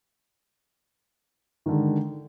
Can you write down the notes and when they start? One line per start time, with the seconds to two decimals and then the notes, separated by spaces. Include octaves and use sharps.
1.66 D#3
1.69 D3
1.72 G#3